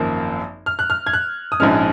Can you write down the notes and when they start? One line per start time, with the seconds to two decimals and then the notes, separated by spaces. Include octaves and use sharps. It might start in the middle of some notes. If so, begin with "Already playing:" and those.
Already playing: G#1 F#2 F3 A#3
0.66 F6
0.79 F#6
0.90 F6
1.07 G#6
1.13 F#6
1.52 D#6
1.60 A#1 G#2 F3 G#3 C#4 F6